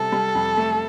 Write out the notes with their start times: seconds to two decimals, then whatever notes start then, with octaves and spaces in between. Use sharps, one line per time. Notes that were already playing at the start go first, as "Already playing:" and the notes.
Already playing: C3 G3 A4
0.12 G3
0.35 F2
0.57 A3